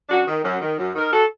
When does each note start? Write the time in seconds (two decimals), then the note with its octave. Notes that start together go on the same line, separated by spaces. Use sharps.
0.09 F#2 D4 F#4
0.27 D#3
0.44 F#2
0.61 D#3
0.78 F#2
0.95 D#3 A#4
1.12 F#4 A4